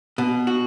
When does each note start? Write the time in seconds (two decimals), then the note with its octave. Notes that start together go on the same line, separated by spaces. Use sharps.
0.18 B2
0.47 F#4